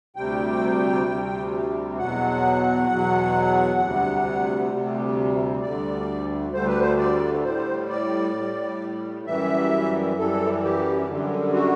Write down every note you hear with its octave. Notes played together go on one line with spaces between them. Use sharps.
D2 C3 G3 G5
D2 C3 G3
E2 B2 F#3 F#5
E2 B2 F#3
D2 C3 G3
D2 C3 G3
D2 D3 G3 D5
D2 D3 G3 C5
B4
C5
D5
A2 G3 C5
D5
A2 G3
F#2 E3 G3 E5
F#2 E3 G3 A4
G4
F#2 D3 G3
F#4